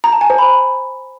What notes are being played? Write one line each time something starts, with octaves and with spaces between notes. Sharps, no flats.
A#5
A5
G#5
C5
B5